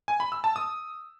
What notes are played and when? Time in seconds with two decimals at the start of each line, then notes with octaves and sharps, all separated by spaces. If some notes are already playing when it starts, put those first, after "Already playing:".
0.08 G#5
0.20 B5
0.32 E6
0.44 A5
0.56 D#6